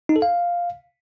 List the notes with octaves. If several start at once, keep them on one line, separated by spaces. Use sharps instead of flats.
D#4
A4
F5